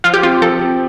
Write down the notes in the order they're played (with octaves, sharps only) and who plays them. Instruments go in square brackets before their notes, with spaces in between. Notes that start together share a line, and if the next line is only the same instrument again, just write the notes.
[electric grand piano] F3 [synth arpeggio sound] F4
[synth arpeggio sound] G4
[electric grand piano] C4 [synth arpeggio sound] F4
[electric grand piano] G4
[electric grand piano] F3 [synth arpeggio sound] A4
[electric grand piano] C4 G4